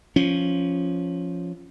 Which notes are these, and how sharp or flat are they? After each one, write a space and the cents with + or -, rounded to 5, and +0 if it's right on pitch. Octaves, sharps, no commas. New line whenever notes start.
F3 +0 C#4 +0